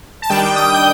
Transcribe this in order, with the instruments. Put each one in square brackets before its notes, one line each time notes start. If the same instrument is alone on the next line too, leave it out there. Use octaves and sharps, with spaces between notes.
[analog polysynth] A5
D#3 G3 D4 G5
D#6
G6